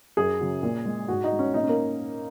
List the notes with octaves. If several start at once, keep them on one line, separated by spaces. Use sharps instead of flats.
F#2 G#4
C#3 F#3
A#2
G#3
G#2 F#4
D#4
G#3
C#4
A#2 D#4
C#4
A#3